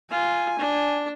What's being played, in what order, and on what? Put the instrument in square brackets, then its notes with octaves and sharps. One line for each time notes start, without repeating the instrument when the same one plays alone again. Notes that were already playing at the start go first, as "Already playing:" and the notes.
[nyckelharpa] F4 [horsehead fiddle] G#5
[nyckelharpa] D4